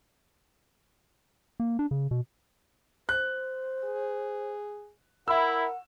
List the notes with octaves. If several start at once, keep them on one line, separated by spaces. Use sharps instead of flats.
A#3
D4
C#3
B2
C5 F#6
G#4
E4 A#4 F#5 E6